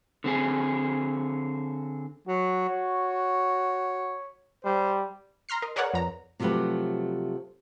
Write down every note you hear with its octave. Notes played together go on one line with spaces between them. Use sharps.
D3 C4 G#4
F#3 F#4
C#5
G3 C5
A#5 C6 F6 C7
A#4 D#5
G#4 A#4 B4 C#5 D5 F#5
F2 A#5
C3 F3 F#3 A3 G4 B4